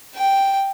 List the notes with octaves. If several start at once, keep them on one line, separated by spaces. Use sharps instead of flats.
G5